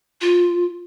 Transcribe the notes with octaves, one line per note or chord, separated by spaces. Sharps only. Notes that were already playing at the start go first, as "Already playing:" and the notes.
F4